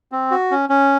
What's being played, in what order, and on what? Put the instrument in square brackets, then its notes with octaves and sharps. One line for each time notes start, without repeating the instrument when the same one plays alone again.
[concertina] C4
F#4
C#4
C#4